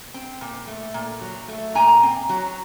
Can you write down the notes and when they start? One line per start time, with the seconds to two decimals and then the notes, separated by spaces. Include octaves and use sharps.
0.14 C4
0.41 A#2
0.67 A3
0.94 A#2
1.21 F#3
1.48 A3
1.75 A#2 G#5 A#5
2.03 C4
2.29 F#3